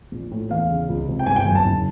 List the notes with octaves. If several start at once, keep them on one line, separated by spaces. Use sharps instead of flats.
A#1
A2
E2 F5
C#3
C#2
C3
G5
G1 G#5
G5
F#2 G#5
A5
F#1